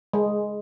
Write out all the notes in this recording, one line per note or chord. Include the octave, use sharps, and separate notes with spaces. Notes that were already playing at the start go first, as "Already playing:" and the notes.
G#3